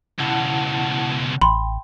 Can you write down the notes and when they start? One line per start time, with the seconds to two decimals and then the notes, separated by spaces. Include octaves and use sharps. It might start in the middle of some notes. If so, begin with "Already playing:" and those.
0.19 C#2 B2 E4 F#5 A5
1.41 A1 G5 B5 C6